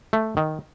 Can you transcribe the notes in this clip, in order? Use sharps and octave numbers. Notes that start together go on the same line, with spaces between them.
A3
D#3